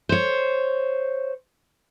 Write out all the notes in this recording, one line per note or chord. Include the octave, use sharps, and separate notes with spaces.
C5 C#5